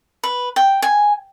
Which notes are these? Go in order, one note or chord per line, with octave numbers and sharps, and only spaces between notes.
B4
G5
G#5